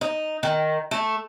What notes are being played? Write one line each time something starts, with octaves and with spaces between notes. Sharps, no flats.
D#4
D#3
A3